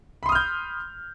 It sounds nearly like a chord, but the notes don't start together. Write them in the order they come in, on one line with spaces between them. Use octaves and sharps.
B5 C6 D#6 F6 G6